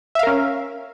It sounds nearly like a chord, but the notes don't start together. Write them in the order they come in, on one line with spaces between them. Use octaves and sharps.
E5 F5 A#4 C#4